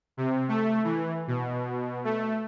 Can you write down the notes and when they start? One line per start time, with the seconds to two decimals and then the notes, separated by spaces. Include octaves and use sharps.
0.17 C3
0.48 A3
0.84 E3
1.28 B2
2.04 A3